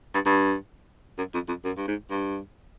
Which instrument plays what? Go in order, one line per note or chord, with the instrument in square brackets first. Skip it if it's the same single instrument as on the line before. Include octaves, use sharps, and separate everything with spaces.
[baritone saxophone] G2
G2
F#2
F2
F2
F#2
G2
G#2
G2